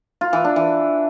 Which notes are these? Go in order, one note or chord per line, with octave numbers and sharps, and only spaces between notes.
F4
E3
D4
E3